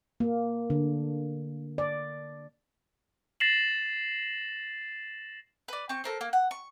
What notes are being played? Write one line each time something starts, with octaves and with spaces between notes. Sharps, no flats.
A#3
D3
D5
A6 A#6 C7 E7 F#7
B4 D5
C4 C#6
A4 A#4 C5
A#3
F#5
C#6